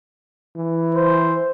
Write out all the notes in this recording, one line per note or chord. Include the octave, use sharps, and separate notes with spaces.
E3
C5